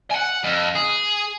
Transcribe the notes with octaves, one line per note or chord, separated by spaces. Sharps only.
F#5 G#5
F2
G#4